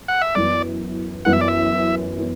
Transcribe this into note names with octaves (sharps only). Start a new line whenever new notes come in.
F#5
E5
F#2 E3 B3 D5
F#2 E3 B3 F#5
E5
D5
E5
E3 B3